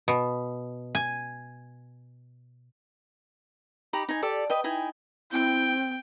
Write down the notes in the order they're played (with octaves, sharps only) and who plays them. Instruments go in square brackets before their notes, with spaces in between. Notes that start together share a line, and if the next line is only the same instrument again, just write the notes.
[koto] B2
G#5
[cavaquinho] D#4 G4 A#5 B5
D#4 G#5
G4 A4 D5
B4 D#5 G5
D#4 E4 G5 G#5
[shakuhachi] C4 [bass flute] E4 [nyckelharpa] G5